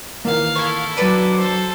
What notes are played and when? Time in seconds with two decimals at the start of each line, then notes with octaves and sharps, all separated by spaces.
0.25 D#3 E3 A#3 F5
0.56 E4 A4 C#5
0.97 F#3 D4 B4 D5
1.36 A4 C5